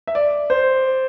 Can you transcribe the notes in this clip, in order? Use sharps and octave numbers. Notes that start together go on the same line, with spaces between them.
E5
D5
C5